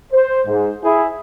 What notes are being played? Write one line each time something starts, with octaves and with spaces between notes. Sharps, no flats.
C5
G#2
E4 G#4